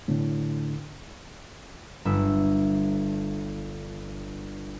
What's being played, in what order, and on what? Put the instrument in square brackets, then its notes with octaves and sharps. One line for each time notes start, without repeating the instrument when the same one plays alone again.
[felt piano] A2 D3
[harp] G1 E5